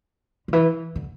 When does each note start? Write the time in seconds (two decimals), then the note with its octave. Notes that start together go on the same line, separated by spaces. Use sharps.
0.48 D3
0.53 E3
0.96 D3